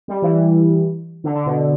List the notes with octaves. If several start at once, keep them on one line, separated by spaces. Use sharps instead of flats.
G3
E3
D3
D3
B2